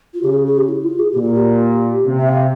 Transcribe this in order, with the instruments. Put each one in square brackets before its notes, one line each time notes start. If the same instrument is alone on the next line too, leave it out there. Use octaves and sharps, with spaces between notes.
[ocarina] F4
[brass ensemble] C#3 [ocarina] G4
[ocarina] G#4
G#4
G4
E4
F4
G#4
[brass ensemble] A#2 [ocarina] G4
[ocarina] F4
G4
[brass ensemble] C3
[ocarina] E5
F5